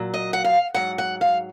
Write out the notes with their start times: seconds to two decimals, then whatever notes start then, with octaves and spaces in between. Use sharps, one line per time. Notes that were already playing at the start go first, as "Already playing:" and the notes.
Already playing: A#2 F#3
0.14 D#5
0.33 F#5
0.44 F5
0.74 G#2 F#3 F#5
0.98 F#5
1.21 F5